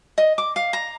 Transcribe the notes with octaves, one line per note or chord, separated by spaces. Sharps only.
D#5
D6
F5
A#5